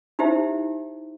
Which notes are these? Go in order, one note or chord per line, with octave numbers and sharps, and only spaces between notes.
D#4 E4 G4 C5 E5